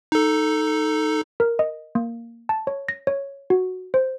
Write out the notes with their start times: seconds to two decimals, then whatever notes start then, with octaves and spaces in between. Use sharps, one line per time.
0.12 D#4 A4
1.40 A#4
1.59 D#5
1.95 A#3
2.49 A5
2.67 C#5
2.89 A#6
3.07 C#5
3.50 F#4
3.94 C5